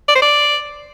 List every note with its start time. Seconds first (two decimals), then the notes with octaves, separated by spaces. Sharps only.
0.08 D5
0.15 C5
0.22 D5